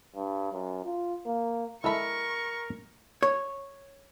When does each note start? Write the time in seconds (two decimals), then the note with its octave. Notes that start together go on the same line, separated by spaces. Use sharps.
0.15 G2
0.52 F#2
0.85 F4
1.26 A#3
1.84 G#3 E4 A4 A#4 E5 B5 C#6
3.23 C#5